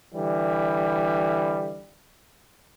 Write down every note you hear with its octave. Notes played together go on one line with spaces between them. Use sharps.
D3 E3 G3